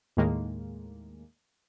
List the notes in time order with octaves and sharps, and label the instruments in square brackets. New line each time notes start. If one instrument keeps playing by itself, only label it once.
[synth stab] D#2 A2 D#3 G#3 A#3